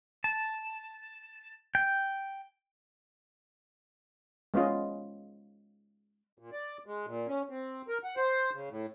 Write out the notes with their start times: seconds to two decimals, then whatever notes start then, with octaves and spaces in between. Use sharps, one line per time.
0.24 A5
1.75 G5
4.54 G#3 B3 C#4 F4 D#5
6.39 A#2
6.52 D5
6.86 G#3
7.07 A#2
7.27 C#4
7.50 C4
7.88 A#4
8.04 F#5
8.17 C5
8.54 C#3
8.69 A2